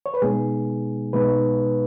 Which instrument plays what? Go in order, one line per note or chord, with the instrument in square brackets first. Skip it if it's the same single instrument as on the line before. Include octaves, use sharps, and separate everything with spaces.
[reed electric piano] C#5
B4
B2 G#3 B3 D#4 G#4
B2 G#3 B3 D#4 B4